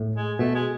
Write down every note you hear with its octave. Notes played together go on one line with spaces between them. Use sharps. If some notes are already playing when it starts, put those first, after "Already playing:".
Already playing: A2
G#3
B2 A3
G#3